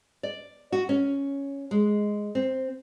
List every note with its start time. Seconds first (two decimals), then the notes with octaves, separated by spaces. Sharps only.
0.23 D5
0.72 F#4
0.89 C#4
1.71 G#3
2.35 C4